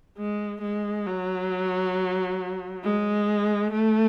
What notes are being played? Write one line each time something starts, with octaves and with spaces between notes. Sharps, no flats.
G#3
G#3
F#3
G#3
A3